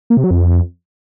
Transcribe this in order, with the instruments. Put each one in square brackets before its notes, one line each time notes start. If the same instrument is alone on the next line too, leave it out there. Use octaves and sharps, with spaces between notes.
[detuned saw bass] A#3
C3
F#3
F2